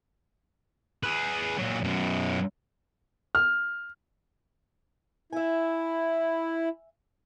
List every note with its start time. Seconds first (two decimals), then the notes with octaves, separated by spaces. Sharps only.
1.03 G#4 B4
1.58 A#2 F#3
1.84 F#2 B2
3.35 F6
5.32 E4 E5 G#5